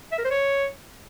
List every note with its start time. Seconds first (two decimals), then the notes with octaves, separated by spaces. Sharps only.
0.12 E5
0.18 A#4
0.25 C5
0.31 C#5